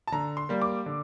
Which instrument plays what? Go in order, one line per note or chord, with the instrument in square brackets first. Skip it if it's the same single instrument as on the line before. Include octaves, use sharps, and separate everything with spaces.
[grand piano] A5
D3 A#5
C6
G3 A#3
D6
D3